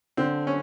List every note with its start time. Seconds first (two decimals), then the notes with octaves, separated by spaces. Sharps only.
0.17 D3 C4
0.47 C#4